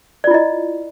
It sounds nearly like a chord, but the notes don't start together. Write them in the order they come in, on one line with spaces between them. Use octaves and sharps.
D5 F4 E4 D#5